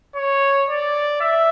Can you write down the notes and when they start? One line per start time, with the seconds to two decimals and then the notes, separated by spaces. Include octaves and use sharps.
0.16 C#5
0.69 D5
1.21 E5